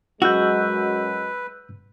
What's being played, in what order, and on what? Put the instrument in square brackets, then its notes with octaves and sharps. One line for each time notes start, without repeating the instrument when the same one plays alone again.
[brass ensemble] F#2 F#3 G#3 [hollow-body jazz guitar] F#4 [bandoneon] B4 [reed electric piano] E6 F#6 G6